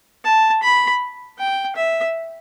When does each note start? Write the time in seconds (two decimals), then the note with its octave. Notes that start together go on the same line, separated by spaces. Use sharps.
0.24 A5
0.63 B5
1.39 G5
1.76 E5